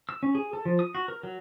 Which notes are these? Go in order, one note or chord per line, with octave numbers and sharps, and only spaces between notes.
E6
C#4
G#4
A4
F3
D#6
F#4
A#4
F#3